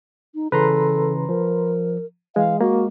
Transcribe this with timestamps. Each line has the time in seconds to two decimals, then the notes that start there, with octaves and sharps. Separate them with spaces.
0.35 D#4
0.52 C#3 E3 C#4 A4 B4 A#5 C6
1.29 F3 A#4
2.36 E3 G#3 F5
2.61 G#3 A#3 F#4